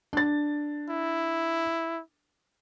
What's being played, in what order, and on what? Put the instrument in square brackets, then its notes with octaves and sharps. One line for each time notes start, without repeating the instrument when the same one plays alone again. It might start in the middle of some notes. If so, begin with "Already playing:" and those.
[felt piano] D4 A6
[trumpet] E4